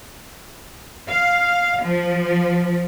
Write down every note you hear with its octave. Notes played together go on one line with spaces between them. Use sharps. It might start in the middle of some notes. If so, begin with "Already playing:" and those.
F5
F3